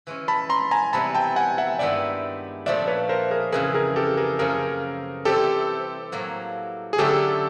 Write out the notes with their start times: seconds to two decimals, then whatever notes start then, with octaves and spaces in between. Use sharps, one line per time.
0.07 E3 G#3 C#4
0.28 A5 B5
0.49 A#5 C6
0.71 G#5 A#5
0.93 C3 E3 G3 B3 A5 B5
1.15 G5 A5
1.36 F#5 G#5
1.58 E5 F#5
1.79 G2 D#3 G#3 B3 E4 D5 E5
2.66 A#2 F3 A3 D4 D5 E5
2.87 B4 C#5
3.09 A#4 C5
3.31 G#4 A#4
3.52 F2 C#3 E3 G#4 A#4
3.74 G#4 A#4
3.96 G4 A4
4.17 G#4 A#4
4.39 F#2 C#3 F3 A#3 G#4 A#4
5.25 C3 E3 G3 C4 G4 A4
6.12 A2 F#3 A#3
6.93 G#4
6.98 D3 F#3 A3 C#4 E4 G4 A4